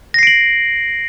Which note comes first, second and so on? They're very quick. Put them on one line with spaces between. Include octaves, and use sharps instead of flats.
A#6 C7 D7 F#7